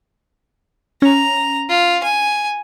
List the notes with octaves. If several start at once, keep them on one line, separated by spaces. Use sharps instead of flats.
C#4 A#5
F4
G#5